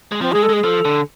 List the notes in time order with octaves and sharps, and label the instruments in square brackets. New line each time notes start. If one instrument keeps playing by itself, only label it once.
[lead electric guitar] G#3
[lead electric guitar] F3 [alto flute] C4
[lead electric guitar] G#3 [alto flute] G#4
[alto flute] A4
[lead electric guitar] G#3 [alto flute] G#4
[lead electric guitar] F3 [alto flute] A4
[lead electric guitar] D3